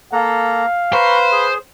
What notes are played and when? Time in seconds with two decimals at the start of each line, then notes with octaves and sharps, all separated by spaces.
0.13 A#3 A4 F5 A#5
0.93 B4 C5 A#5 B5 C#6
1.32 G#4